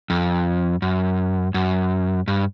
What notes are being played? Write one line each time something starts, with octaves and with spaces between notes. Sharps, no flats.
F2
F#2
F#2
G2